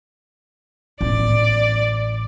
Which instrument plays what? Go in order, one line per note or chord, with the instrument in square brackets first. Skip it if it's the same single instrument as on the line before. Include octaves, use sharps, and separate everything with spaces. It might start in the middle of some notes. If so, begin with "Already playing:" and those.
[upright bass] A1 B3 [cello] D5